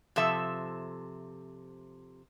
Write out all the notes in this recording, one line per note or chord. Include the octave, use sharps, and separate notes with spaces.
C3 F3 A4 E5